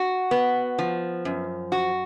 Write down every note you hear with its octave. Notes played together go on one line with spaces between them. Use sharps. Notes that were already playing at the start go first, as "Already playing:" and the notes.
Already playing: F#4
B3
F3
F#2
F#4